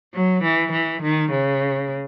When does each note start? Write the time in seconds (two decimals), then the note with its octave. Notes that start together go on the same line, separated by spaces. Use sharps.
0.14 F#3
0.43 E3
0.72 E3
1.02 D#3
1.31 C#3